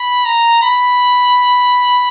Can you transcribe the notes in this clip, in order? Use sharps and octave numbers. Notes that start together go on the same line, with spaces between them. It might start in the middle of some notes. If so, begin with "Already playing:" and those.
Already playing: B5
A#5
B5